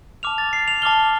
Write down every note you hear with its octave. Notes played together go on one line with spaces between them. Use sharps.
A5 D6 F6 F7
A6
C7
F7
A5 D6 F6 G7